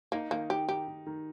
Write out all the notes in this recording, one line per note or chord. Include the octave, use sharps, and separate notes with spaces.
A#3 D#4
D#3 A#3
D#3 G4
D#3 G4
D#3
D#3